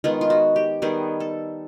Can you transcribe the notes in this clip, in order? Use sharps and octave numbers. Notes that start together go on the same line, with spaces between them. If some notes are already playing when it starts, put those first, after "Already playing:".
D#3 G#3 B3 F4
F4
F#4
G4
D#3 G3 B3 G#4
A4